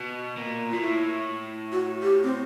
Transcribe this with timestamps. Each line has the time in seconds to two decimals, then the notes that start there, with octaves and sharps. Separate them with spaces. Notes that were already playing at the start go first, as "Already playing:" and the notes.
Already playing: B2
0.37 A#2
0.71 A#2 F4
0.82 A2 E4
1.72 F#4
2.02 G4
2.24 C4